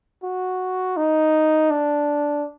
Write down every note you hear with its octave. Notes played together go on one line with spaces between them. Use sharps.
F#4
D#4
D4